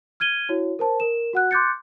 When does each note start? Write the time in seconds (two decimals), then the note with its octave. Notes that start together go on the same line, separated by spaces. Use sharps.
0.20 F6 G#6 D#7 G7
0.49 E4 F#4 C#5
0.79 A#4 C5 A5
1.00 A#4 E7
1.33 F#4 F#5 F#6
1.51 C6 D6 F#6 G6 A6 C#7